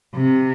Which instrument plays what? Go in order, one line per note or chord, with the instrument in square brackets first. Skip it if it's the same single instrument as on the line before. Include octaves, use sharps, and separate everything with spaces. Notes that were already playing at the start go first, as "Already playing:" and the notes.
[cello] C3